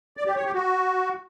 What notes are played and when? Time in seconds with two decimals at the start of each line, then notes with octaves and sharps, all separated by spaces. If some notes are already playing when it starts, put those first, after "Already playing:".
0.17 D5
0.26 G4
0.36 C#5
0.45 G4
0.54 F#4